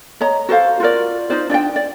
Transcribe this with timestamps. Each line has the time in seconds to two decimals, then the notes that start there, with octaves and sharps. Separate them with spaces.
0.21 C#5 D#5 A#5
0.49 F#4 A4 C5 F5
0.80 F4 F#4 A#4 D5
1.30 D#4 F4 C5 D5
1.50 D4 D5 D#5 G5
1.76 D5